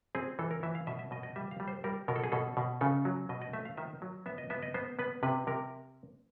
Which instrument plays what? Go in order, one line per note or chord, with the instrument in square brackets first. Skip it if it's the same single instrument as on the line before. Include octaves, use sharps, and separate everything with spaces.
[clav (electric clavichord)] C4 G#4
E3 A4
A#4
E3 E5
F5
B2 E5
E5
B2 D#5
D#5
G3 E5
F5
G3
C5
G3 A#4
B2 A#4
A4
G#4
B2 A4
B2
C#3 A4
F#3
B2 D#5
D#5
A3 E5
F5
D#3 E5
F#3
B3 E5
D#5
B3 E5
D#5
B3 C5
B3 B4
C3 B4
C3 A#4